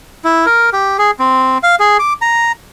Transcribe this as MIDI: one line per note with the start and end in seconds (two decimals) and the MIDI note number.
0.24 0.46 64
0.46 0.70 70
0.73 0.97 67
0.98 1.11 68
1.19 1.58 60
1.63 1.75 77
1.80 1.97 68
1.99 2.13 86
2.22 2.52 82